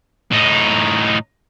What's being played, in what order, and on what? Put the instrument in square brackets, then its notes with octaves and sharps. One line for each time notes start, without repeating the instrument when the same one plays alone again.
[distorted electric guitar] A2 D#4